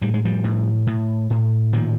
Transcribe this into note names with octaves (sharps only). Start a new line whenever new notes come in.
A2 G3
G#3
F3 G3
A2
A2
A2
A#2 D#3 F3